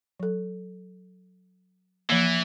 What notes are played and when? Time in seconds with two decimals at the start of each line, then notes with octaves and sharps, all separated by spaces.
0.20 F#3 A4
2.10 E3 F3 A#3